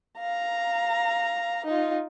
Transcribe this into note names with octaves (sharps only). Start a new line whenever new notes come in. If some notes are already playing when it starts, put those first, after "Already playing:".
F5 A#5
D#4 F4